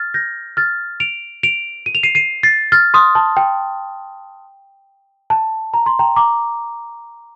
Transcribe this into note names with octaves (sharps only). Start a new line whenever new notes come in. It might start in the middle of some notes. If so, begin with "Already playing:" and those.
Already playing: F6 A6
G6 A#6
F6 A6
D7 F7
D7 F7
D#7
F7
C7 D#7
C7 D#7
A6 C7
F6 A6
C6 D#6
A5
G5
A5
A#5
C6
G5 A#5
A#5 D6